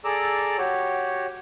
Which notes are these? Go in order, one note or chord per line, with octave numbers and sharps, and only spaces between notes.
G#4 A4 D5 A#5 D6 E6
F#4 G4 C#5